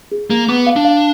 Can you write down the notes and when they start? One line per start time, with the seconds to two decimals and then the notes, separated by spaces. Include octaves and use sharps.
0.12 G#4
0.30 A#3 G#4
0.48 B3 D6
0.67 F5
0.76 D4
0.85 F5